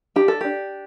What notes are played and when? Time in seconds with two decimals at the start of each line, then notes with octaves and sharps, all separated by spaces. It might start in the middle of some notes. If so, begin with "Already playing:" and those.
0.16 D4 G4
0.28 A4
0.41 D4 G4